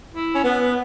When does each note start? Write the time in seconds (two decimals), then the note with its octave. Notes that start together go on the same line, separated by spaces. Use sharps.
0.15 E4
0.34 C#4
0.43 B3